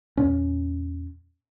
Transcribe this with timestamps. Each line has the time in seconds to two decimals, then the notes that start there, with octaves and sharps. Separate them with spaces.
0.17 E2 A#2 C#4